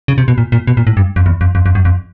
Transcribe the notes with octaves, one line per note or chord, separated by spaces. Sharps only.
C#3
C3
B2
A#2
A#2
B2
A#2
A2
G2
F2
E2
F2
F2
F2
F#2
F2